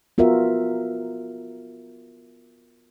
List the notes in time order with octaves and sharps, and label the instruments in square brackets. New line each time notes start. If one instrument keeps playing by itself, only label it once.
[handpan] B3 F4 F#4 A#4 E5